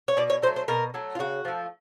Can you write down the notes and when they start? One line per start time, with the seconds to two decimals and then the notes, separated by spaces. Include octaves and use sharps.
0.08 C#5
0.17 B2 D5
0.30 C#5
0.42 F#3 C5
0.47 A3
0.56 C5
0.68 B2 A#4
0.94 F#3 A3
1.15 F4
1.19 C#3 F#4
1.45 F3 A3